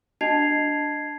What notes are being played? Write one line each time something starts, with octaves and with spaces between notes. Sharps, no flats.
D4 D#5 A5 G#6 C7 F7